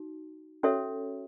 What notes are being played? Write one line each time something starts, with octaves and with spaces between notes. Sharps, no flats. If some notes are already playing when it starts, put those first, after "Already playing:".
Already playing: D#4 F#4
C#4 F#4 A4 C#5 E5